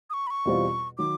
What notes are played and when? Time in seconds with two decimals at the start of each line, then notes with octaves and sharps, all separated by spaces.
0.10 D#6
0.13 C#6
0.27 B5
0.30 C#6
0.45 E2 B2 G3 C4 F4
0.98 D#3 F#3 D6